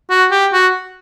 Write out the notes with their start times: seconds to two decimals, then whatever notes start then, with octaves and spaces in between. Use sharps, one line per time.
0.10 F#4
0.31 G4
0.53 F#4